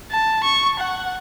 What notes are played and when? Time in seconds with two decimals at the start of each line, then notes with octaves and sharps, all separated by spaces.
0.12 A5
0.44 C#6
0.79 F#5